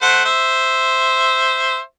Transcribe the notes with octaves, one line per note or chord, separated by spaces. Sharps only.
A3 C5 F#5
C5 E5